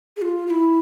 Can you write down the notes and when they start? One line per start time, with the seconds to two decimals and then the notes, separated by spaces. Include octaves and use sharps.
0.17 G#4
0.22 F4
0.47 F4
0.50 E4